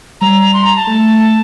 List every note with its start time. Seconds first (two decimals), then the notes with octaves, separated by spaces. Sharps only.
0.21 G3 A#5
0.53 C6
0.65 A#5
0.76 A5
0.87 A3